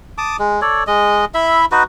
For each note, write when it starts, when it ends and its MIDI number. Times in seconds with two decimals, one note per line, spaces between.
0.18 0.37 81
0.18 0.37 86
0.18 0.37 87
0.39 0.61 56
0.62 0.84 69
0.62 0.84 73
0.62 0.84 74
0.87 1.25 56
0.87 1.25 75
1.34 1.65 64
1.34 1.65 76
1.34 1.65 83
1.72 1.83 63
1.72 1.83 66
1.72 1.83 71